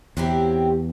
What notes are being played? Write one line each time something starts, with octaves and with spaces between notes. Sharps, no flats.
E2 F#3 C4 E4 G4